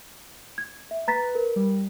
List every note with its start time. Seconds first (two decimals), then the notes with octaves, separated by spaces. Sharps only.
0.58 G#6
0.91 E5
1.08 B4 A#5 A6 B6
1.35 A#4
1.56 G3